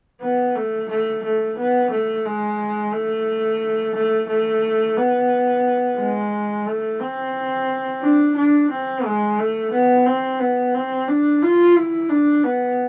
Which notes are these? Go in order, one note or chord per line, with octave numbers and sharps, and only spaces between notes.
B3
A3
A3
A3
B3
A3
G#3
A3
A3
A3
B3
G#3
A3
C4
D4
D4
C4
G#3
A3
B3
C4
B3
C4
D4
F4
E4
D4
B3